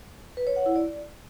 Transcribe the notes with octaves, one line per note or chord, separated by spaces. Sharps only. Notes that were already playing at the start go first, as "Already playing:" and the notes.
B4
C#5
F#5
E4
D5